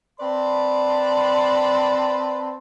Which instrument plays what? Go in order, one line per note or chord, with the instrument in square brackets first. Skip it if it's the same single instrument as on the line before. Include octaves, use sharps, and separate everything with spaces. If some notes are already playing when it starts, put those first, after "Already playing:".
[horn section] C4 B4 D5 A5 B5 C6